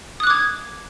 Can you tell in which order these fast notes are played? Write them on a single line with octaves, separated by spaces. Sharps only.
D#6 F#6 D6 G#6